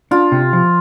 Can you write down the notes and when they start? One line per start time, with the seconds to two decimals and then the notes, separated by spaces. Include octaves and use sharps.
0.11 D4 F4
0.32 C3
0.53 F3